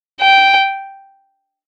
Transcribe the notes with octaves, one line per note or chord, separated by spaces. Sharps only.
G5